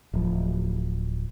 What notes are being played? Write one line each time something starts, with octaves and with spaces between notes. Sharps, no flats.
D1 F3